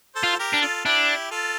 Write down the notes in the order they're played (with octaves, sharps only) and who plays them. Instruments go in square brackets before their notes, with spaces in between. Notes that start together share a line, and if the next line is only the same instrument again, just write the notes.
[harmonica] A4 C5
[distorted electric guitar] F4
[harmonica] G4 A#4
[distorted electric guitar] D4
[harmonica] F4 A4
[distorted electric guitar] D4 [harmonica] E4 G4
[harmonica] F4 A4